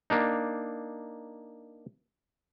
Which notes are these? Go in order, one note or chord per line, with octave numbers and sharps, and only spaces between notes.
A#3 D4 D#4